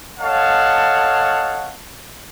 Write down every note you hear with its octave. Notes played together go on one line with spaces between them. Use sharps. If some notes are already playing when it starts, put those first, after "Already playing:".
A4 C#5 D#5 F5 F#5 A5